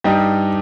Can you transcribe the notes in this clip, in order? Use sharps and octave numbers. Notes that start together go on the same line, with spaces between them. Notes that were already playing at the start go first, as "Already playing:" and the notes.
G2 G3 D#4 G4